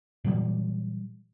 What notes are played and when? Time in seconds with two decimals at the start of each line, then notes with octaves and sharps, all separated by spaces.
0.24 A#2 E3 F#3 G3